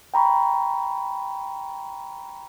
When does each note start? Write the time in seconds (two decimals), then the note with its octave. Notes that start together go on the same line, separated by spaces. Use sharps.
0.14 G5 A#5 B5 C#6